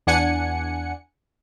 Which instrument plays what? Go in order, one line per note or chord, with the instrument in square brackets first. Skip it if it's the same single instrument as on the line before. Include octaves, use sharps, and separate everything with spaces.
[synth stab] E2 D4 F#5 G#5 C#7